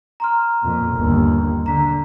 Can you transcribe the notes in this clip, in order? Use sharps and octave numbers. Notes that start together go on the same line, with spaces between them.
A#5 C6 F6
F2 A#2
G1 D#2
D3 A#5 B6